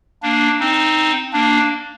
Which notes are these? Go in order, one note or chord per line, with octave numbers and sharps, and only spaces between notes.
A#3 D4
C4 D#4
A#3 D4